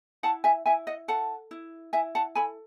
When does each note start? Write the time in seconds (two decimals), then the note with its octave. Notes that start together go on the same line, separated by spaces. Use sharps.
0.23 E4 F#5 A5
0.44 E5 G#5
0.66 E4 E5 G#5
0.87 D#5 F#5
1.08 A4 F#5 A5
1.51 E4
1.93 E4 E5 G#5
2.15 F#5 A5
2.35 A4 G#5 B5